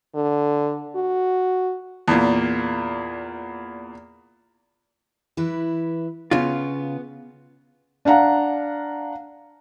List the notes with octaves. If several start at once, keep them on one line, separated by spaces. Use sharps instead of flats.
D3
F#4
E2 A#2
E3 E4 B4
C#3 B3 F4
D4 F5 F#5 A#5